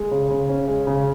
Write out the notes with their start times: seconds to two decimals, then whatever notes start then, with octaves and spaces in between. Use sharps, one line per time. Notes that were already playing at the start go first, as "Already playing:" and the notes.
Already playing: G#3
0.11 C#3
0.30 C#3
0.49 C#4
0.68 G#3
0.87 C#3